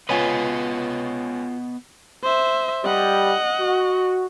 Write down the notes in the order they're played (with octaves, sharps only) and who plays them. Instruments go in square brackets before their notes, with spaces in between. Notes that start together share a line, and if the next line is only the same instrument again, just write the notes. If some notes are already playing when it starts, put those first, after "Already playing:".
[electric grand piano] C#2 C#5 G#5 [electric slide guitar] B3 D#5 [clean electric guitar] F4 B4
[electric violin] C5 E5
[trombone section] G3 [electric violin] D#5 F#5
[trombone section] F#4